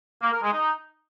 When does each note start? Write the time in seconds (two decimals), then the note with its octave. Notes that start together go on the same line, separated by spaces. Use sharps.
0.22 A#3
0.33 A#4
0.43 G#3
0.53 D#4